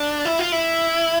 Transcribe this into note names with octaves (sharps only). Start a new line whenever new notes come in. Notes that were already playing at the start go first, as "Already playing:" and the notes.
Already playing: D4
E4
F4
E4